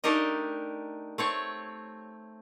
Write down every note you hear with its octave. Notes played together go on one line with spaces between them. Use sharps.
A3 D4 D#4 G4 A#4 D#5
A3 C4 C#5